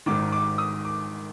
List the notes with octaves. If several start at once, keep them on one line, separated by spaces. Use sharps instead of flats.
G#1 G#2 D#3 D6
D6
D#6
D6